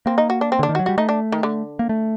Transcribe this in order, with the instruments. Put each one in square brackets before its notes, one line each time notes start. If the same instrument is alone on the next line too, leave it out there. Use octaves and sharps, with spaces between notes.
[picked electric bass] A#3 [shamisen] C4
[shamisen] D#4
F#4
D4
C4
[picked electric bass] D3 [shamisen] D4
[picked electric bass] D#3
[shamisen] F#4
[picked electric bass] F#3
[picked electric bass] G3 [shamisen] F#4
[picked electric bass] A3 [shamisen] D#4
[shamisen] D4
D#3
D3
[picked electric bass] A#3
A3